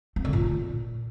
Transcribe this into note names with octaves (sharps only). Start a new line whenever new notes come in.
C4
D3
A#2